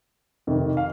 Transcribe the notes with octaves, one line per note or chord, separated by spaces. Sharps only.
F2 C3 D#3
F5